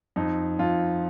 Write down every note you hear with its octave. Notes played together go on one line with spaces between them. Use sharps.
F2 D#4
F2 F4